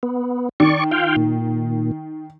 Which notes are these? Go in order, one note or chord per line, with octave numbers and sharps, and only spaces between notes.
B3
D#3 D5 C#6
F4 F5 G5
A#2